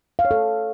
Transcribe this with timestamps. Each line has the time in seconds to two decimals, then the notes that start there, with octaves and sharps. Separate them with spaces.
0.19 F5
0.25 C#5
0.31 A4